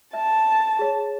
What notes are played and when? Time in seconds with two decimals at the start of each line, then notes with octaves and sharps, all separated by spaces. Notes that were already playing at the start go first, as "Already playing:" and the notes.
0.13 E5 A5
0.79 G#4 C#5